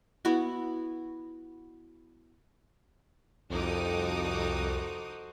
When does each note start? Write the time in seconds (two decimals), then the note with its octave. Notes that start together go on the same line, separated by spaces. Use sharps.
0.25 B3 E4 F#4
3.51 C2 F2 D#4 F#4 A4 C5 D6 D#6